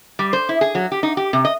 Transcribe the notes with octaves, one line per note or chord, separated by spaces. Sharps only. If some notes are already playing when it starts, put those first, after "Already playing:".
G3
C5
E4
G#4
F#3
G4
D#4
G4
C3
D#5